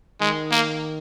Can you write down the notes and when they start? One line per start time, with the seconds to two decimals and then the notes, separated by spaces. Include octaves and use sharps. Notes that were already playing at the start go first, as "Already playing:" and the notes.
0.20 D#3 G#3
0.52 A#3